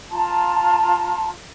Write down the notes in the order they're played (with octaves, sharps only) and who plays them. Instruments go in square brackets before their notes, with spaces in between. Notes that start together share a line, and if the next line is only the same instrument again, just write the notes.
[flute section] F4 A5 A#5 C6